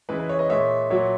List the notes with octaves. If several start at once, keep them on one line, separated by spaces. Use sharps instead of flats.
C#3 E3 G#3 B4
B4
C#5
B4 D#5
A#2 G#3 C#5 E5
A#2 F#3 C#5 E5